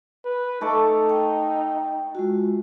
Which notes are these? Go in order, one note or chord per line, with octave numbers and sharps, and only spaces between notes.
B4
A3 D#4 A4 D6
G5
G#3 F4 F#4